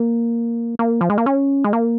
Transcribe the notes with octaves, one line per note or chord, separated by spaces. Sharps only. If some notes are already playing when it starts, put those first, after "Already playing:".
Already playing: A#3
A#3
F3
G#3
A#3
C#4
G#3
A#3